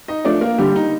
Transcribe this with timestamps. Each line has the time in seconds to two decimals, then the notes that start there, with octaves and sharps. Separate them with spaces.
0.08 D#4 D#5
0.25 F3 A3 D4 D5
0.41 A#3 A#4
0.58 D3 G3 G4
0.76 D#4